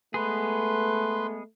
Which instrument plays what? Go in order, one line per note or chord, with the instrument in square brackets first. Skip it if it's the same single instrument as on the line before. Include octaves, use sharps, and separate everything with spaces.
[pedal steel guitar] G#3 B3 G#4 [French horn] A3 [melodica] B4 C6